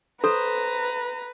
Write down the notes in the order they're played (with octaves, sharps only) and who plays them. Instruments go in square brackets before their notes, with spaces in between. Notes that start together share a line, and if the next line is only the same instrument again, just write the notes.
[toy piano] A4 [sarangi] B4 [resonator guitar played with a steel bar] C5 [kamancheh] A#5